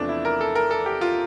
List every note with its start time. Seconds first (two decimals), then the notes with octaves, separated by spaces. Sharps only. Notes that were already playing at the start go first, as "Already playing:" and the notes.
Already playing: E2 C3 F3 A3 D4
0.09 E4
0.25 A#4
0.41 A4
0.55 A#4
0.71 A4
0.86 G4
1.01 F4